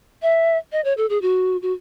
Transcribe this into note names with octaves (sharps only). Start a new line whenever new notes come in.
E5
D#5
C#5
A4
G#4
F#4
F#4